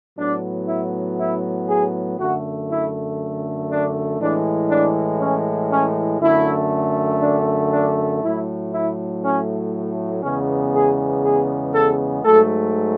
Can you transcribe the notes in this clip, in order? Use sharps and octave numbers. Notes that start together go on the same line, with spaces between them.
A2 F#3 B3 D4
E4
E4
G#4
F#2 D3 A3 F#4
E4
D4
A2 E3 G#3 D4
D4
C#4
C#4
F#2 D3 A3 E4
D4
D4
A2 F#3 A3 E4
E4
C#4
E2 C#3 G#3 B3 C#4
G#4
G#4
A4
G#2 F#3 A3 A4